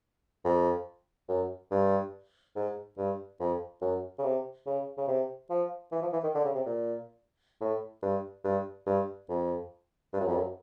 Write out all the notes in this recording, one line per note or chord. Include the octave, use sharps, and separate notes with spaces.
F2
F#2
G2
G#2
G2
F2
F#2
C#3
C3
C#3
C#3
C3
F3
E3
F3
E3
D#3
D3
C#3
C3
A#2
A2
G2
G2
G2
F2
G2
F#2
F2
F#2